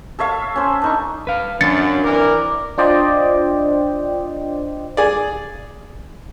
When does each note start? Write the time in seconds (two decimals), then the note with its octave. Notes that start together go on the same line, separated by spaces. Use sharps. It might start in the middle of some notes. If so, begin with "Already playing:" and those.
0.19 A4 C#5 E5 F5
0.56 C#4 C5
0.82 D4 D#4 C#6
1.27 B4 F5
1.61 F#2 D4 A6 C#7
2.04 E3 C4 A#4 D5 D6
2.78 D4 F4 C5 D5 D#5 G5
4.97 G#4 D5